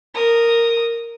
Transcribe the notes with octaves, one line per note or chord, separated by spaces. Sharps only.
A#4 D#6